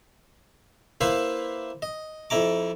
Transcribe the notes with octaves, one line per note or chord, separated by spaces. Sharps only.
A#3 E4 B4 C5 E5 F5
D#5
F2 E4 A#5 D6